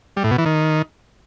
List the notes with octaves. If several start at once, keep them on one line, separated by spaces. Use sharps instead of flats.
G3
A2
B2
E3
D#3